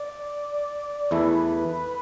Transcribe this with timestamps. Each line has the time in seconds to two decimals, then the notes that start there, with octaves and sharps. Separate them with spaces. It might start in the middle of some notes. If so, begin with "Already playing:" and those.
Already playing: D5
1.11 E2 E3 A3 E4 B4